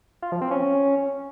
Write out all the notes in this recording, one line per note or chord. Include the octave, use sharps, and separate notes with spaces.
F4
F3
C4
C#4